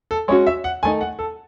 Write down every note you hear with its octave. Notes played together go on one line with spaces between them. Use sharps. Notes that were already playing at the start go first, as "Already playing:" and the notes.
A4
G#3 C#4 F#4 C#5
E5
F#5
D#3 A3 D#4 G#5
F#5
A4